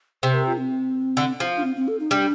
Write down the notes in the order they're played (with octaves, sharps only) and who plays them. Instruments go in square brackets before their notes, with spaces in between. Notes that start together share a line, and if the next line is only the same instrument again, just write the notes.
[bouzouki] C3 [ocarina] C5
[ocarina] A#4
F4
C4
[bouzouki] D3
F3
[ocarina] D4
C4
C4
A4
D#4
[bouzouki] G3 [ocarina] D4